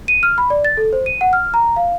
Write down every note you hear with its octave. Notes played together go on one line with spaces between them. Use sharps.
D#7
F6
B5
D5
A6
A4
C5
D#7
F#5
F6
A#5
F5